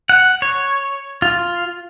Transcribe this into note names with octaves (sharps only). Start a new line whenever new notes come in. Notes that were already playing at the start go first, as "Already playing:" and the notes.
F#5
C#5
F4